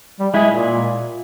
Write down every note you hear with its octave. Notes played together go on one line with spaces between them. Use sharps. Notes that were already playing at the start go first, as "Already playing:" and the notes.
G3
G#3 E4 G#4
A#2